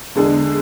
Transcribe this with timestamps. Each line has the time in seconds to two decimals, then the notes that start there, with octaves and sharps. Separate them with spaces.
0.15 E2 D3 G#3 D4 G#4